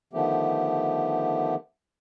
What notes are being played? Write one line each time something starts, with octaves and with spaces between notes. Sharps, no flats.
D3 D#3 F3 A3 B3 G4